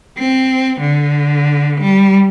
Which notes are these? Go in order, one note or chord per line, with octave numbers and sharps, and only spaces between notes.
C4
D3
G3